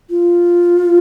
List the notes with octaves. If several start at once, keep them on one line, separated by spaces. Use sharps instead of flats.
F4